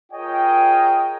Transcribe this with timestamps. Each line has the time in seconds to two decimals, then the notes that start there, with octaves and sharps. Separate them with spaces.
0.13 F4 G#4 A#4 C#5 D#5 G5